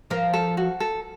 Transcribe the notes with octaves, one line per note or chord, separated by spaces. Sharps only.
F3 F4 A#4
A4
F#4
A4